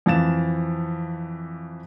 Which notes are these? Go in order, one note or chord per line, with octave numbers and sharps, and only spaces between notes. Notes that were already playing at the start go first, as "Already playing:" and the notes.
F2 E3 F5 A6 E7